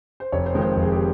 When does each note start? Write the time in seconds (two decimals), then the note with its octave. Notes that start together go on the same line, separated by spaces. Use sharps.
0.20 C5
0.32 F1 C#5
0.46 C5
0.54 F2 D#3 G#3 C4
0.62 C5
0.76 F1
0.82 G#4
0.92 G4